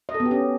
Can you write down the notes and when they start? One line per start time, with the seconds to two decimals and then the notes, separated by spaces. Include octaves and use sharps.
0.09 D#5
0.14 A4
0.20 B3
0.26 G4
0.31 C#4